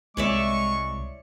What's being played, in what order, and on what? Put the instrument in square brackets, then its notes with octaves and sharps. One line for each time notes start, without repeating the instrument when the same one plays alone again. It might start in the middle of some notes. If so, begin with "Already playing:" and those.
[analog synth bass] C2 [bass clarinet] G#3 [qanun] C#5 D5 E5 [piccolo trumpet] C#6